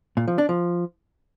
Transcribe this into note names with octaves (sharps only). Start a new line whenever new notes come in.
A#2
F3
D4
F3